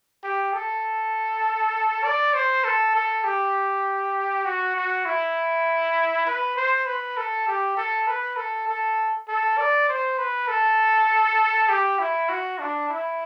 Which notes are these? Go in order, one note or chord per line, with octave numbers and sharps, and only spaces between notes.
G4
A4
D5
C5
A4
A4
G4
F#4
F#4
E4
B4
C5
B4
A4
G4
A4
B4
A4
A4
A4
D5
C5
B4
A4
G4
E4
F#4
D4
E4